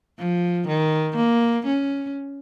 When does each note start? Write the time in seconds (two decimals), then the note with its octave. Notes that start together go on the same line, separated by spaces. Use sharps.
0.19 F3
0.67 D#3
1.16 A#3
1.66 C#4